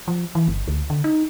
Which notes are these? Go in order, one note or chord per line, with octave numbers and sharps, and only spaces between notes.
F3
E3
G1
D2
D3
D#4